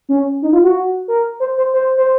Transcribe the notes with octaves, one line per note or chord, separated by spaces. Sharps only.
C#4
D#4
F4
F#4
A#4
C5
C5
C5
C5